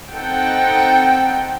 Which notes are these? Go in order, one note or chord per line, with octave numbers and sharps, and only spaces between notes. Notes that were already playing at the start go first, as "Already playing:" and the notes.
C4 D#4 A4 F#5 G5